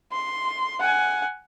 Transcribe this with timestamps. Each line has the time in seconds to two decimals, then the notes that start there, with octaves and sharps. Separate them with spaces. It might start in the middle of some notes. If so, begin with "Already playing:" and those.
0.12 C6
0.80 F#5 G#5